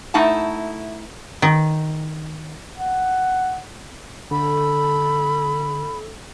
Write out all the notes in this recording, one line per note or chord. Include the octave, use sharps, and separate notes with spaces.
A3 D#4 E4 F#5 A5
D#3
F#5
D3 A4 B5